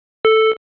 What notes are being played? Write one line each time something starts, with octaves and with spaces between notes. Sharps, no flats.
A4